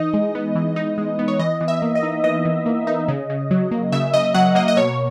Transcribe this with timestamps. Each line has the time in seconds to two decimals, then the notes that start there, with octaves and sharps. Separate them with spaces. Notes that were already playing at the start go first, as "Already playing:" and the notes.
Already playing: E3 D#4 D#5
0.14 G#3
0.35 B3
0.55 E3
0.76 D#4
0.98 G#3
1.19 B3
1.28 C#5
1.39 E3 D#5
1.61 E3
1.68 E5
1.82 A#3
1.95 D#5
2.03 D#4
2.24 E3 D#5
2.45 E3
2.66 A#3
2.87 D#4
3.08 C#3
3.30 C#3
3.51 F#3
3.71 A#3
3.92 C#3 E5
4.13 C#3 D#5
4.34 F#3 F#5
4.55 A#3 D#5
4.68 D#5
4.77 B2 C#5